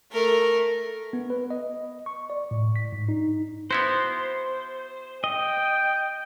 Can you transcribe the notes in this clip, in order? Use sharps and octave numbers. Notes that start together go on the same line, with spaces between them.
A3 A#4
B3
B4
D#5
C#6
D5
A2
B6
G#2
D#4
B3 E4 F#4 C5
D#5 G5